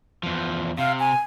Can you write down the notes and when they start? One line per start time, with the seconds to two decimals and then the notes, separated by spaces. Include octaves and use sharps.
0.23 E2 F3
0.78 C3 F5
0.99 G#5